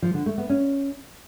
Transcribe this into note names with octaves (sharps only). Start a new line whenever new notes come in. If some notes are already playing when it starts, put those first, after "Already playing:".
F3
D3
A3
B3
C#4